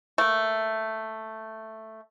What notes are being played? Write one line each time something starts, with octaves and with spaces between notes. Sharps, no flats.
A3 A#3